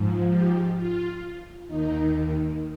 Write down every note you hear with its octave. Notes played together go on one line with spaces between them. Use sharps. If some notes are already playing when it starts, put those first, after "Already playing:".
Already playing: G#2 F3
G4
F4
D#2 D#3 D#4